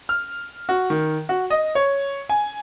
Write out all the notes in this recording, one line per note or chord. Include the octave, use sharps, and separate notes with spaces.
F6
F#4
D#3
F#4
D#5
C#5
G#5